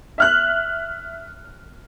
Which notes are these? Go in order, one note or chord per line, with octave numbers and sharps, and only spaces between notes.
E5 F6 F#6